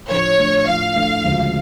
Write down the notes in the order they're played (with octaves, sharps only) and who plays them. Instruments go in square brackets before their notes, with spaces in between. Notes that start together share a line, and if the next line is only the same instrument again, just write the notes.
[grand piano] A2 F3 A3 D4 [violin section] C#5
[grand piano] A2 F3 A3 D4
[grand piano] A2 F3 A3 D4 [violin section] F5
[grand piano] A2 F3 A3 D4
D2 C#3 F3 G#3